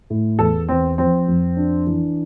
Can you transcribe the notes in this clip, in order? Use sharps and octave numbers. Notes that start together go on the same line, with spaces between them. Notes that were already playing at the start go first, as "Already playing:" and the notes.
A2
E2 A4
E2 C4
F3 C4
F2
D4
E3